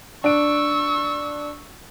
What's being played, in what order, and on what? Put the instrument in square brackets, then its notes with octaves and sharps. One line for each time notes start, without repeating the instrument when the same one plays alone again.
[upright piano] D4 D7 [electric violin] C#6 E6